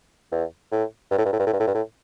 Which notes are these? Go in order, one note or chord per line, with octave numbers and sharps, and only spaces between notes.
E2
A2
G2
A2
G2
A2
G2
A2
G2
A2
G2
A2